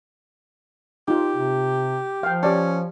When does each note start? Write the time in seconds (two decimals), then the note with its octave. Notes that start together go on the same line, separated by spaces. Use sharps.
1.08 D#4 F4 G4
1.36 C3
2.23 F3 F5 G5
2.43 C#4 G4 D5 A5